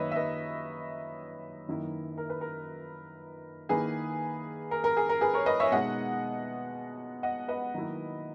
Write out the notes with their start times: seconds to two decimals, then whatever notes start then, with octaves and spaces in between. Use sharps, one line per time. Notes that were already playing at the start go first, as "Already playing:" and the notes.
Already playing: F#2 D#3 A#3 B4 C#5 D#5 E5
0.11 E5
0.16 B4 D#5
1.68 F#2 D#3 A#3 E4
2.18 A#4
2.30 B4
2.41 A#4
3.69 D#3 A#3 E4 G#4 B4
4.71 A#4
4.84 A#4
4.97 G#4
5.09 A#4
5.21 G#4 B4
5.34 A#4 C#5
5.46 B4 D#5
5.60 C#5 E5
5.72 B2 G#3 D#4 D#5 F#5
7.23 D#5 F#5
7.48 B4 D#5
7.74 D#3 F#3 A#3 E4